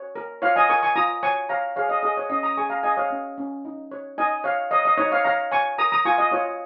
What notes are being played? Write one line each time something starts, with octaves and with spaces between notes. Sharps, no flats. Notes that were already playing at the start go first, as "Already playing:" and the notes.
Already playing: C#5
A#4
F4 C#5 F5
D#5 G#5
A#4 G#5 C#6
G#5 C#6
F4 A#5 D#6
C#5 G#5 C#6
C#5 F5 A#5
G#4 C#5 F5
D#5
G#4 D#5
C#5
C#4 D#5
A#5 D#6
G#4 G#5 C#6
F5 A#5
G#4 D#5 G#5
C#5 F5
C#4
C#4
D#4
C#5
D#4 D#5 G#5
C#5 F5
C#5 D#5
D#5
D#4 C#5
C#5 F5
C#5 F5 A#5
C#5 G#5 C#6
A#4 A#5 D#6
A#5 D#6
F4 G#5 C#6
D#5
F4 C#5